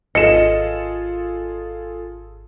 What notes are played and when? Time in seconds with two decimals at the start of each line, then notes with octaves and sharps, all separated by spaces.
0.15 G#1 F4 G#4 A4 D#5 C#7 E7